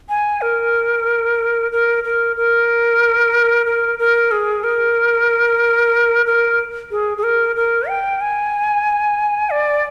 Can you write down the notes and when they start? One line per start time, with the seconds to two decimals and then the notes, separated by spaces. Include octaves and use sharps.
0.09 G#5
0.42 A#4
1.72 A#4
2.04 A#4
2.37 A#4
3.66 A#4
3.99 A#4
4.31 G#4
4.64 A#4
6.26 A#4
6.91 G#4
7.18 G#4
7.23 A#4
7.56 A#4
7.89 G5
8.21 G#5
9.50 D5